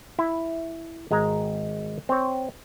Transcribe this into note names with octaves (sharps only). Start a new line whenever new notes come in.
E4
G#1 G#3 G#5 A#5
C4 C#5